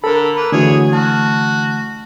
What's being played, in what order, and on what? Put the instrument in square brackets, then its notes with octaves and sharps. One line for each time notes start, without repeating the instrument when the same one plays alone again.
[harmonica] D3 B5 [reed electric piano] A4 A#4
[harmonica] A#3 B4
[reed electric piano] D3 E3 [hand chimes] A3 F#4 [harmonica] G#4 C#5
[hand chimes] A3 A5 F6 [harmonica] F#4